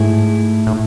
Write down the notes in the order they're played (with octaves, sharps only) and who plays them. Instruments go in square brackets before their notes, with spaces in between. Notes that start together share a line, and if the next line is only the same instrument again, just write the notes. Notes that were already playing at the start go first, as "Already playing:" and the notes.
Already playing: [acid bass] G#2 [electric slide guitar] A3 E4 G#4
[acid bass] A2